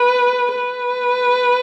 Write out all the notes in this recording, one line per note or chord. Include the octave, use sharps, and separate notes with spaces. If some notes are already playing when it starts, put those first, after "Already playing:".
Already playing: B4
B4